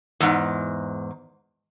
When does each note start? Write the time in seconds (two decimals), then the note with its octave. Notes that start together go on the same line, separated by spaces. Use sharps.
0.20 E2 G#2